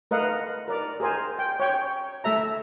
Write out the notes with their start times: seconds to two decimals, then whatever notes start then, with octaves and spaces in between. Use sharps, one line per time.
0.11 A3 A#4 B4 D#5 F5 F#5
0.68 A#4 D5
1.00 G#4 A#4 C5 G#5
1.39 G5
1.60 C#5 G5
2.24 A3 A4 E5 A#5